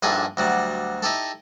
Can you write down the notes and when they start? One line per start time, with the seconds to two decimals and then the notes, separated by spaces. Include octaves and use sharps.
0.03 A#1 G2 D#4 E4 G#4 A4
0.37 D2 F#3 G3
1.02 D#4 E4 G4 A4